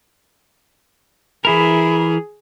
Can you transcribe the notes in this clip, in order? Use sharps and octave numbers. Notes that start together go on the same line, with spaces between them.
E3 E4 G#4 A#4 B5